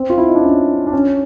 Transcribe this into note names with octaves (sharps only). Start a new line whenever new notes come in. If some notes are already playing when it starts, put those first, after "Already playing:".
Already playing: C4
F4
E4
D#4
D4
C#4
D4
C#4